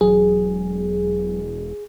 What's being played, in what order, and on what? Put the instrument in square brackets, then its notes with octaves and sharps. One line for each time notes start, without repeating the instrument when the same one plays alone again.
[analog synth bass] E1 [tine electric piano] F#3 [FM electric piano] G#4